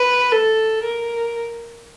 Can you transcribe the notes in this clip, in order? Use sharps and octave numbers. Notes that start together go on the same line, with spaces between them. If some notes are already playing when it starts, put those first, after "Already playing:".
Already playing: B4
A4
A#4